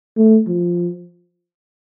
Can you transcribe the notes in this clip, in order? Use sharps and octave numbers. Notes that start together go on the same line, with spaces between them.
A3
F3